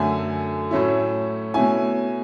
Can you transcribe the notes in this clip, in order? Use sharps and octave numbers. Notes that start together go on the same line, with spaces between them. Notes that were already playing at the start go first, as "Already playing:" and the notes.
Already playing: F#2 D3 A3 G#5
A2 F#3 A3 C#4 E4
B2 A3 C#4 E4 G#5